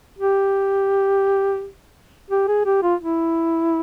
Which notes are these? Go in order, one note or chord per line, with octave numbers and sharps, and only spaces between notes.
G4
G4
G#4
G4
F4
E4